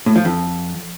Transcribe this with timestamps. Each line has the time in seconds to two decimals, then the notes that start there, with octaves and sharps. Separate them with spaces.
0.06 A2
0.16 F3
0.25 F2